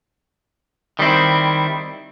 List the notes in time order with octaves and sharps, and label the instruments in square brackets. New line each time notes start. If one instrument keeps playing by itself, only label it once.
[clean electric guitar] D#3 G3 C4 E4